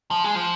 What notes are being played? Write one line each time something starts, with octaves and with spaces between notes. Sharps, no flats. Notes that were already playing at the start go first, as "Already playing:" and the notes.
F3
G#3
F3